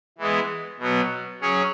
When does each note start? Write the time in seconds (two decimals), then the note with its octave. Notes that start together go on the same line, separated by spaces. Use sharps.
0.18 E3 G#3 B3
0.79 B2 F#3 B3
1.41 F#3 C#4 G#4 C#5